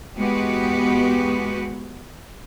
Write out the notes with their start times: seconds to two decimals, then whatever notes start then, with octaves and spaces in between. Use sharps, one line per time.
0.16 E2 G#3 B3 F#4 G4 B4